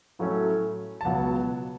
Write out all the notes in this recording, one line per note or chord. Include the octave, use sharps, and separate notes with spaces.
A2 F#3 A3 C#4
A5
C#2 B2 F#3 B3 F#5